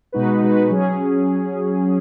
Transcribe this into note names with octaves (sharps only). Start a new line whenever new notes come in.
B2 G#3 D#4 F#4 B4
B2 G#3 D#4 F#4 B4
F#3 C#4 G#4